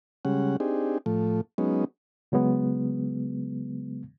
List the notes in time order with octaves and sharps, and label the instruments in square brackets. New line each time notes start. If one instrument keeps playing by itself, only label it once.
[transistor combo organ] C#3 G3 G#3 C#4 F#5
C4 D4 D#4 G4 G#4
A2 F3 A3
F#3 G#3 B3 C#4 D#4
[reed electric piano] C#3 F#3 G#3 B3